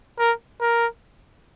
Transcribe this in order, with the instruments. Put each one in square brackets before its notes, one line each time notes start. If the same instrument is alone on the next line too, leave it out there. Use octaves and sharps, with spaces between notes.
[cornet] A#4
A#4